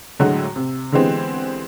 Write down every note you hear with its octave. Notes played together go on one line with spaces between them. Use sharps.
A2 D3 F#3 G#3 A3 F#4
C3
D3 E3 G#3 B3 C4 G4